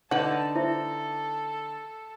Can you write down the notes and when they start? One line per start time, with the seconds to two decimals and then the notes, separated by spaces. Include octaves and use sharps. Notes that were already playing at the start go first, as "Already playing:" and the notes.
0.11 D3 D#4 B4 F#5 A5
0.56 E4 A4 C5 E5